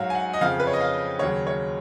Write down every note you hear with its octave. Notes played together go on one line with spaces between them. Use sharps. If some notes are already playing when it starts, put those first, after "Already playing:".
Already playing: G#2 F#3 C#5 F5
G#5
F#5
D#5
F2 C#3 F3 F5
B4
C#5
D#5
F5
D#2 C#3 F#3 C#5
C#5